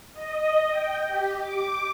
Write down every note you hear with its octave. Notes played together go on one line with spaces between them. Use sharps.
D#5
G5
G4
D6